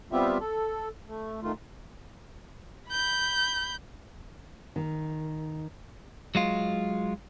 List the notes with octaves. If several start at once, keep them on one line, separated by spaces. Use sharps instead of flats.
G3 B3 C4 F4 G4 E5
A4
A3
D#3 A3 F4
B5 G6
D#3
F#3 G#3 F4